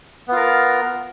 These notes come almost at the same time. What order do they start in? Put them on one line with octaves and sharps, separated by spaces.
B3 F4 A#4